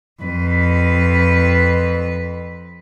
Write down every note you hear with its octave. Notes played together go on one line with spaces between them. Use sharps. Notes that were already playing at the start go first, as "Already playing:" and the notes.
F2 B4